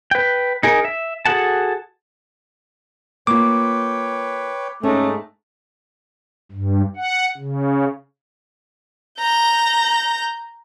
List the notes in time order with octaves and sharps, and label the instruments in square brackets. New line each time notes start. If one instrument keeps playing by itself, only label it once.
[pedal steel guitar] B4 G5
D#4 G#4 A#4
E5
F#4 G#4 A4 F#5 A5
[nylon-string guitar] A#3 F4 [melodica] B4 C#5 G5 [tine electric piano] D6
[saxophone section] G#2 A3 [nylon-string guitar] C#4
[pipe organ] G2
F#5
C#3
[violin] A#5 G6